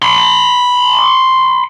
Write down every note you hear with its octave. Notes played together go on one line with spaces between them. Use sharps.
B5 C6